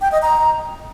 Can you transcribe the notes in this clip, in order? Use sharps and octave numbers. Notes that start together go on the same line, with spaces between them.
G5
D#5
A#5